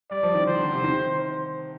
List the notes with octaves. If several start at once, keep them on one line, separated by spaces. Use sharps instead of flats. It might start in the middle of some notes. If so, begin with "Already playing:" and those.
G3 D5
F3
D#3
D#3 C5
D3
C3
D#3
C5